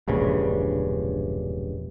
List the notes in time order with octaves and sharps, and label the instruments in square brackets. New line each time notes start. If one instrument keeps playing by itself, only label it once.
[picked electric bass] E1 A#1 G2 C#3